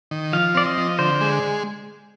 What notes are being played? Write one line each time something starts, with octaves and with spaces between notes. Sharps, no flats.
D#3
F3 F5
C4 D5
D#5
F3
D3 C5
G#3